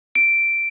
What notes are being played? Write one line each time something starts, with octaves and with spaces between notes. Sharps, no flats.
D7